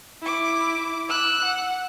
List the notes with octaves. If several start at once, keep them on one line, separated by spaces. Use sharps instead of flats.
E4 D6
E6 F#6
F#5